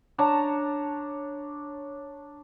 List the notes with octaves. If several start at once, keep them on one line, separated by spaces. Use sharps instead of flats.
D4 C#5 A5 A#5